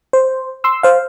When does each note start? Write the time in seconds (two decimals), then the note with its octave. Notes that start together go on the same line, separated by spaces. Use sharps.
0.13 C5
0.64 C6 E6
0.83 C5 F5